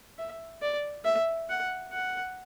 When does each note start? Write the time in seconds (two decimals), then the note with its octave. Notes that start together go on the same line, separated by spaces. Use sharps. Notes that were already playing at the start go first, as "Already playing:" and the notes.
0.18 E5
0.62 D5
1.05 E5
1.50 F#5
1.93 F#5